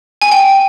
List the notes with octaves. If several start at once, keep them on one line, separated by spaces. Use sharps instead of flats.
G#5
G5